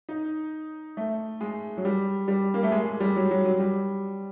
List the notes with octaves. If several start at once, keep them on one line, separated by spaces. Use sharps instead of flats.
D#4
A3
G#3
F#3
G3
G3
A#3
A3
G#3
G#3
G3
F#3
F#3
F#3
G3